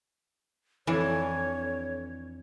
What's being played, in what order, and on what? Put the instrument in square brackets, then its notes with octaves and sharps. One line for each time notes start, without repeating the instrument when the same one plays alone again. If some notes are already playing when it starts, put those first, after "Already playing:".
[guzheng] F2 D4 [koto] E3 [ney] C#5